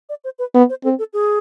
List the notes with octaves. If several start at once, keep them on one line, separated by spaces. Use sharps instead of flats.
D5
C5
B4
B3
C5
C4 A4
A4
G#4